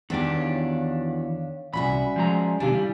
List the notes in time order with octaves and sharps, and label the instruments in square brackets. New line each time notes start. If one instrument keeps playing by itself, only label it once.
[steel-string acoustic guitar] E2 E3 F#4 [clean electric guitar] D#3 D4 G4
[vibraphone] C#5 F5
[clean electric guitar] C2 G#2 B5 [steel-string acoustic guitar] C#4 F#4 E5 [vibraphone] D5 G#5
[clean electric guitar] F3 G#3 A#5
[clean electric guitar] C3 D#3 D4 [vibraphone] G4 F5 [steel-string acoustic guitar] G#5
[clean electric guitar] G3 [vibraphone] E4